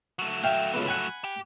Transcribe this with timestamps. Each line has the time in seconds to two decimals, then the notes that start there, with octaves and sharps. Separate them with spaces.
0.19 F#3 A3
0.44 E5 F5 G5
0.74 C#2 B3
0.86 F#5 G#5 B5
1.24 G4